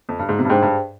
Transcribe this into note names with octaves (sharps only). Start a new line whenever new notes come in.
F2
G2
G#2
C3
G2
G#2 D4 G#4 C5 G5
G2